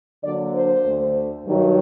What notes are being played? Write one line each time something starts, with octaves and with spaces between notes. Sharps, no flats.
D3 F#3 A#3 D4 D5
C5
D2 D3 A3
G2 D#3 F#3